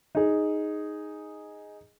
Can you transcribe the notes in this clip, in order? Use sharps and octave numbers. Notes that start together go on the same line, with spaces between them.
D#4 G#4